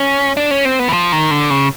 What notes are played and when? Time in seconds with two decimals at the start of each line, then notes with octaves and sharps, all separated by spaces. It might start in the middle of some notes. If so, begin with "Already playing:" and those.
Already playing: C#4
0.37 D4
0.51 C#4
0.65 C4
0.79 B3
0.89 E3
0.93 F3
1.12 D#3
1.31 D3
1.50 C#3